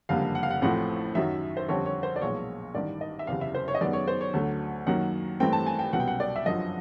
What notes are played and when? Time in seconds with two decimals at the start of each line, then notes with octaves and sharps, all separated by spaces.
0.09 F#1 F2 D3 G3 A#3 F5
0.35 F#5
0.43 F5
0.51 F#5
0.61 A1 A2 F3 A3 C4 F#5
1.15 F#2 D#3 F#3 E5
1.57 C5
1.68 F2 D3 G3 C4 C#5
1.86 C#5
2.03 C5
2.16 D5
2.21 B1 A#2 F3 G#3 B3 C#5
2.74 A1 G2 D#3 D5
3.01 D#5
3.19 E5
3.27 F#1 E2 C3 F5
3.41 E5
3.55 C5
3.68 C#5
3.75 D#5
3.81 F#2 D#3 G#3 B3 D5
3.93 C#5
4.08 C5
4.21 C#5
4.33 D2 D3 F#3 A3
4.87 F#2 D#3 F#3 A#3 F#5
5.40 G2 E3 A3 C4 G5
5.53 A5
5.67 G#5
5.79 G5
5.93 C2 B2 F#3 F#5
6.00 G5
6.07 F#5
6.20 D5
6.36 E5
6.46 G1 F#2 D3 F3 D#5